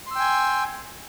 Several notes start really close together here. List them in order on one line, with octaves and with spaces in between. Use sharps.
C6 E6 G5 G#5